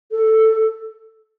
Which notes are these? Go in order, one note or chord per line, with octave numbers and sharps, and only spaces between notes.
A4